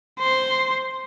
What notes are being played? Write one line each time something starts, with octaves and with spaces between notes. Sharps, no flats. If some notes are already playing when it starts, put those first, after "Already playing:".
C5